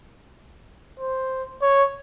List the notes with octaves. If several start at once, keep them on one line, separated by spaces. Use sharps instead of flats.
C5
C#5